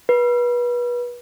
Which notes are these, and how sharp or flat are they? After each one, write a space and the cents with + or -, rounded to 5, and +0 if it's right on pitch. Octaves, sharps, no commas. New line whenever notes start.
B4 -30